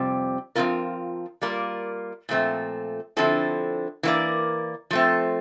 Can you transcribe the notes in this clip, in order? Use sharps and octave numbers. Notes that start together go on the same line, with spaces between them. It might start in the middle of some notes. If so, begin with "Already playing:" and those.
Already playing: F2 C3 G3 C4 G4
F3 C4 F4 A#4
G3 A#3 F4 A#4 D5
A#2 F3 A3 C4
D3 F3 C4 E4 A4
E3 A#3 F4 A#4 D5
F3 A3 C4